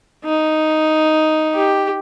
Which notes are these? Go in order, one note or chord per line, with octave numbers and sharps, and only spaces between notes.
D#4
G4